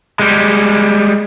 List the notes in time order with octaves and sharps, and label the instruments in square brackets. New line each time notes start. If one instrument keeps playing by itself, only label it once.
[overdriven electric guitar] G3 G#3